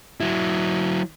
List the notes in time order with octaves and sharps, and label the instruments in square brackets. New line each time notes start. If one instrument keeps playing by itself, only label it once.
[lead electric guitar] F#3 E4